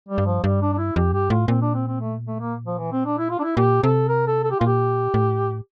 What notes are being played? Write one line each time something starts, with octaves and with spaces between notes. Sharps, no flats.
G3
G2
F3
G2 G3
D4
D4
E4
F2 G4
G2 G4
A2 F4
A#2 C4
D4
C4
C4
A3
A3
A#3
F3
E3
C4
D4
E4
F4
D4
E4
A#2 G4
C3 A4
A#4
A4
A4
G4
A#2 F4
G4
A2